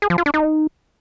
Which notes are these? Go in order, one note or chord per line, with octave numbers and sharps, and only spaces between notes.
G#4
F3
F4
D4
D#4